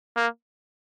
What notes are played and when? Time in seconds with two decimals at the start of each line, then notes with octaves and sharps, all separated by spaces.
0.17 A#3